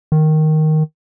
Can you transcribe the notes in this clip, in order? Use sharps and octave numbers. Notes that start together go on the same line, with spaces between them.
D#3